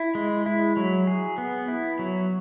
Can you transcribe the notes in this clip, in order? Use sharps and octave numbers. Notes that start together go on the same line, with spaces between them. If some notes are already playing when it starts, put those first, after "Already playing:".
Already playing: E4
G#3
E4
F#3
G#4
B3
E4
F#3